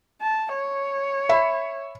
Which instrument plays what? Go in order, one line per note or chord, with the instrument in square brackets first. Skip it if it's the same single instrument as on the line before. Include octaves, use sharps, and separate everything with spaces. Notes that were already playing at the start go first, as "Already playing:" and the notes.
[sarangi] A5
C#5
[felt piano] E5 B5